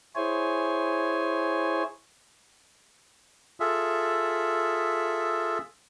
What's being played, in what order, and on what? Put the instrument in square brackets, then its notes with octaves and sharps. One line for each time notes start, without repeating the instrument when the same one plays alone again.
[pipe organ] E4 G#4 C5 C#5 G#5
[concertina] F4 G#4 A4 E5